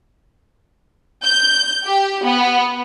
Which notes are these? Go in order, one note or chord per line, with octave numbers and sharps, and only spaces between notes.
G6
G4
B3